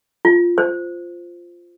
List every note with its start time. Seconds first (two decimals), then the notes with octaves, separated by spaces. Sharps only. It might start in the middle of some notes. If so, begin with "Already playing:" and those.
0.25 F4
0.58 C5